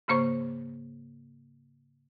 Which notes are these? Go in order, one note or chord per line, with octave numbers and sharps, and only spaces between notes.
G#2 C#3 A#3 C5 C#6